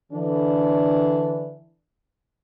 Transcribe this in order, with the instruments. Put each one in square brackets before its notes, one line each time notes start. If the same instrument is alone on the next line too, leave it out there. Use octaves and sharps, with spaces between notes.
[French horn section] D3 E3 D4